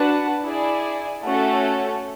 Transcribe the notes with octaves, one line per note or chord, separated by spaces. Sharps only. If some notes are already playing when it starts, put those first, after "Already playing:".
Already playing: D4 F#4 B4 F#5 A5
E4 G#4 D5
A3 C#4 F#4 A4